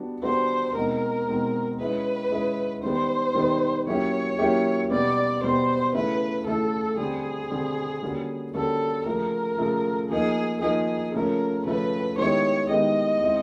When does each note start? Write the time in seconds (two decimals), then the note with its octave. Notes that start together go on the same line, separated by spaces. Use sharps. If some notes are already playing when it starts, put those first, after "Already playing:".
Already playing: G3 B3 D4 F#4
0.23 G3 B3 D4 F#4 C5
0.74 B2 G#3 C4 D#4 A#4
1.27 B2 G#3 C4 D#4
1.79 G#3 C#4 E4 G#4 B4
2.31 G#3 C#4 E4 G#4
2.83 D#3 G3 B3 C5
3.35 D#3 G3 B3
3.87 F#3 A#3 C#4 E4 G4 C#5
4.39 F#3 A#3 C#4 E4 G4
4.91 B2 G3 B3 D5
5.43 B2 G3 B3 C5
5.94 C#3 E3 A3 C#4 E4 B4
6.46 C#3 E3 A3 C#4 E4 A4
6.98 D3 G3 C4 G#4
7.50 D3 G3 C4
8.03 D3 G3 A#3 C#4 F#4
8.54 D3 G3 A#3 C#4 F#4 A4
9.06 C#3 F3 A3 A#4
9.58 C#3 F3 A3
10.09 F3 A#3 D#4 G#4
10.61 F3 A#3 D#4 G#4
11.14 C#3 F3 A3 C#4 A#4
11.65 C#3 F3 A3 C#4 B4
12.18 D#3 G#3 B3 E4 G4 C#5
12.69 D#3 G#3 B3 E4 G4 D#5
13.21 G#3 C4 E4